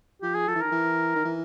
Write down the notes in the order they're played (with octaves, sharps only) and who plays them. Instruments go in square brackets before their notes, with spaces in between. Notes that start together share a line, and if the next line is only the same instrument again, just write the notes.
[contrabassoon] F3 [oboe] G4
[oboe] G#4
[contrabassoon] F3 [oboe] A4
[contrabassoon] E3
[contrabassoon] D#3 [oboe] A#4
[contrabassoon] E3
D#3
E3